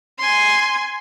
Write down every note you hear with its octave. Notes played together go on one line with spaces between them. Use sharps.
G#5 C6